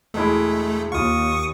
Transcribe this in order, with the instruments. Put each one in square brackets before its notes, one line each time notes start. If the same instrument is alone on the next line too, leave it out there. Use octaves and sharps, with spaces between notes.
[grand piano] E1 G#3 E4 [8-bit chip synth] A3
[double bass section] D#2 [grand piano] F4 [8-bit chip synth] C#6 D#6